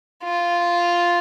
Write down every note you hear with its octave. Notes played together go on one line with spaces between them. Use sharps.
F4